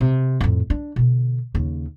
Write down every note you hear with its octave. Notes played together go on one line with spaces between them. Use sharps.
C3
F2 A2
D4
B2 D3
D#2 C#3